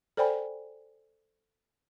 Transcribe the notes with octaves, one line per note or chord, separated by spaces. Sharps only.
A4 C5 D5 G5 G#5 B5